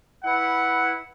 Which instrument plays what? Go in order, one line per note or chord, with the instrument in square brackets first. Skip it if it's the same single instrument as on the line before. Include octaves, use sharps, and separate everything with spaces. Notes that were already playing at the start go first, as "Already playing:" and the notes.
[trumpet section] E4 B4 F#5